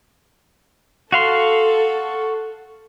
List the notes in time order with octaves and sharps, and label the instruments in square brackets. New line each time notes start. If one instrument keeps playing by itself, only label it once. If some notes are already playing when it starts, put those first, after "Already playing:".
[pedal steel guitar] F#4 F5 C6 [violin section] A4